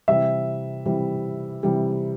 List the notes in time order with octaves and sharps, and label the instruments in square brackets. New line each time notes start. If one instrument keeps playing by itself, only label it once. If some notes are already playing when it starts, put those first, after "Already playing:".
[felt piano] C3 E3 G3 [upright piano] E5
[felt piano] C3 E3 G3
C3 E3 G3